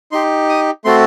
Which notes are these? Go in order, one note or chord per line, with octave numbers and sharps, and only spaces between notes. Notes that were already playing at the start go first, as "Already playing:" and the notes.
D#4 G4 C6
D#6
A3 C4 F#4 A4 C6